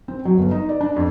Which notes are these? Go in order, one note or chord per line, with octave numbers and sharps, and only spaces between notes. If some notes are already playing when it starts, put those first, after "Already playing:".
C4
F#3
G1
D#4
D5
D4
F2